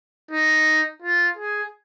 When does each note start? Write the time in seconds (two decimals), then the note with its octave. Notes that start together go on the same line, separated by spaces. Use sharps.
0.31 D#4
1.02 F4
1.37 G#4